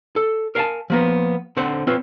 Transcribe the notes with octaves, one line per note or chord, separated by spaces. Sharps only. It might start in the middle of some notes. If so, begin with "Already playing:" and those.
A4
A#4 F5 F#5 G#5 A5
F3 A#3 B3
D3 C4 C5 F#5
C4 F4 B4 C#5